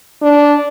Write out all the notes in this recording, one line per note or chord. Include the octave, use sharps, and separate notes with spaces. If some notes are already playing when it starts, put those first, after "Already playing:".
D4